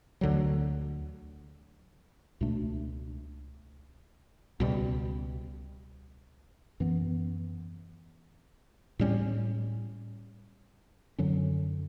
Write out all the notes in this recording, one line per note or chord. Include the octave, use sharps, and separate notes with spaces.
D2 D3 F#3
C#2 B2 A3 D4
C#2 B2 G3
F#2 E3 B3
A2 G3 C#4
F#2 D3 F#3 C#4